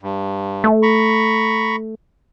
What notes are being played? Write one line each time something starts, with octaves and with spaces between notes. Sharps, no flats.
G2
A3
A#5 B5 C#6